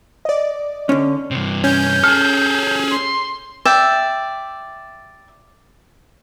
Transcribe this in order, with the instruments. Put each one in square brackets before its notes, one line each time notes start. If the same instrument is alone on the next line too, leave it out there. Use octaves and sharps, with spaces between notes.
[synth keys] D5 D#5
[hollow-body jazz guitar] D3 C#4
[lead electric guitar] G2 C3
[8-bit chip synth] C#4 [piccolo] G6
[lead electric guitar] G#4 A4 [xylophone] F6
[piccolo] C6
[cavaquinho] D5 E5 G5